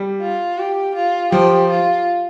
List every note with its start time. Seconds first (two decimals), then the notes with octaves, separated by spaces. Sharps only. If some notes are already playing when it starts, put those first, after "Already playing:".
Already playing: G3
0.22 F4
0.58 G4
0.95 F4
1.32 F3 G4
1.70 F4